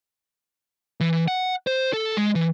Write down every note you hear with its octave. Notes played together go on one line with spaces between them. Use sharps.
E3
F#5
C5
A4
G#3
E3